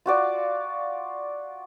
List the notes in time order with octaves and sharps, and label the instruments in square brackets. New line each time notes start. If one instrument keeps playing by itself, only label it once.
[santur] F4 F#4 D5 F5